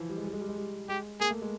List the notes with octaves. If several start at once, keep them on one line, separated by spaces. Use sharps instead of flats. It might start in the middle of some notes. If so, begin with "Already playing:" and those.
Already playing: E3 F3
G3
G#3
G3
G#3
G3
G#3
G3
G#3 G4
A#3 G#4
A3
G#3